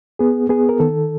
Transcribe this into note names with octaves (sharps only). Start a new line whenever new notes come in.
B3 G#4
B3 G#4
A#4
D#3 A4